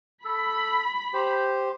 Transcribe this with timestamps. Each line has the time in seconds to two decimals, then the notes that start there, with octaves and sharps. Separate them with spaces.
0.25 A4 B5
1.13 G4 C5